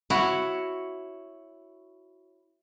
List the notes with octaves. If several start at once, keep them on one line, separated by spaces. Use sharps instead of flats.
E4 F#4 C#5